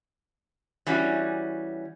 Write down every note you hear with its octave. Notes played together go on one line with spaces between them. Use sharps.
E3 G3 C#4 F#4